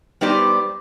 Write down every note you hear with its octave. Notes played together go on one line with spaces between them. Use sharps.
G3 B3 D#4 G4 C5 D5